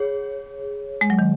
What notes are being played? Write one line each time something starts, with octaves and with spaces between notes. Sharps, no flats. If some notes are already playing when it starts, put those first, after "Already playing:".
Already playing: G#4 C#5
G#3
F#3
D#3